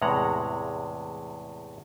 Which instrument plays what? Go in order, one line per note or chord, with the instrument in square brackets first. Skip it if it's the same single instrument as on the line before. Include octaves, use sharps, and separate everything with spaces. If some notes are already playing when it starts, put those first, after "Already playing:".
[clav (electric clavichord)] E2 A2 C3 G#3 F#5 A#5